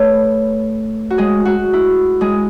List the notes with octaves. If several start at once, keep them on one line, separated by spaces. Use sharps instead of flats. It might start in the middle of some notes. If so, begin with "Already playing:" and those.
Already playing: A3 A4 B4 C#5
F#4
G#3 G#4
F#4
E4
G#3 G#4